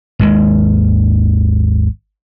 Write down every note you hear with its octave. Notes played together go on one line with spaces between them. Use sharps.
G#1 D#2 D#3 G#3